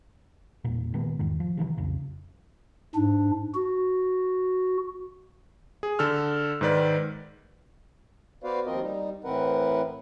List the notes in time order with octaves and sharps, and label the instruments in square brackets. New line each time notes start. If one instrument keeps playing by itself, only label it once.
[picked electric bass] E1 A#2
A#2 D#3 G#3 B3
E2 G#2 D#3
F3
C3 D#3 E3 F#3
B1 F2 C#3
[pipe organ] G#2 D4
F#4
[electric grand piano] G#4
D3 A4 E6 F6
G#2 D#3 B4 D5
[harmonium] B3 F#4 B4 C5 D5 F5
D#2 F3 C4 F4 A#4 D#5
G3 D#4
A2 E3 C4 A#4 B4 F#5